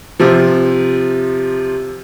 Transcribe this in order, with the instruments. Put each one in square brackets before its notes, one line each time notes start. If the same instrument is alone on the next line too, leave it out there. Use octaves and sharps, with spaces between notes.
[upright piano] C3 F3